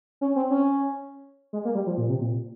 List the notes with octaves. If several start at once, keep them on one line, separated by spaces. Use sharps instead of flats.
C#4
C4
C#4
G#3
A#3
G3
F3
A#2
C3
A#2